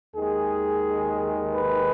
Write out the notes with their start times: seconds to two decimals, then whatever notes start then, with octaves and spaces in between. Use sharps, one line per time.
0.15 D#2 D#3 G#3 G#4
1.55 B4